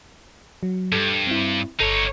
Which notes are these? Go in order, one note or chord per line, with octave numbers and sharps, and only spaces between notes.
F#3
G2 G3 A4
C4 E4
G1 D#4 A4 C#5 C7